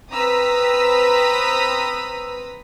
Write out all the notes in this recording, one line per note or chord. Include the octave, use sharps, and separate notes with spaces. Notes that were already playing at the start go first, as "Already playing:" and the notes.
C4 B4 A#5 D#6 E6 B6